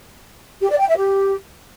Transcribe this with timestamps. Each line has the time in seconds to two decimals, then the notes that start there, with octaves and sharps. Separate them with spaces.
0.61 G4
0.70 D5
0.79 G5
0.88 E5
0.97 G4